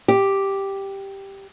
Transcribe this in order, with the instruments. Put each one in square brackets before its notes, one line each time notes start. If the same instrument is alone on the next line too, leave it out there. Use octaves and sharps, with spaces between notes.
[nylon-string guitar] G4